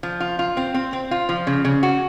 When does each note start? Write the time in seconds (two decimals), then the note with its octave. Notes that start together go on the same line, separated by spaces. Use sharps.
0.03 F3
0.20 F4
0.39 F4
0.57 C4
0.74 C4
0.93 C4
1.11 F4
1.29 F3
1.47 C#3
1.65 C#3
1.83 F#4